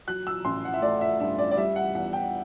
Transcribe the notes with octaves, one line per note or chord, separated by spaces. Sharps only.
F#3 F#6
E6
A1 C6
F#5
E5
A3 D5
E5
G2 E5
D5
D5
G3 E5
F#5
E2 F#5
G5